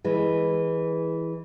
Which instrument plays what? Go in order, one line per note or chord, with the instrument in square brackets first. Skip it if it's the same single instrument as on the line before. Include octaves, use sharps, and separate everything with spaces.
[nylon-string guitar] E3 G#3